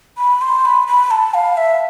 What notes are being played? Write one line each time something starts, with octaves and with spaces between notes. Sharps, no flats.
B5
C6
B5
B5
A5
F5
E5